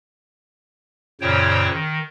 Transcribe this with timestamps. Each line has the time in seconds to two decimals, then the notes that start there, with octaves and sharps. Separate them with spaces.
1.21 F#2 A#2 C#3 C5 C#5 G5
1.71 D#3